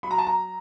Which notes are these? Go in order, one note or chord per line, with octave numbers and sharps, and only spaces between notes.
F#3 B5
A#5
A5
A#5